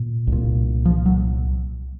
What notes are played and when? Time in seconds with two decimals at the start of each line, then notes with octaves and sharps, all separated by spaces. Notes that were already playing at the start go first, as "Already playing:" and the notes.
Already playing: A#2
0.27 C2
0.32 A#2
0.85 F3
1.06 F#3